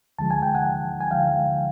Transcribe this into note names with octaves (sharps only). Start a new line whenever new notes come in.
D2 D3 F3 G#3 A5
G#5
G5
F#5 G#5
G#5
D2 D3 F3 G#3 F5 G5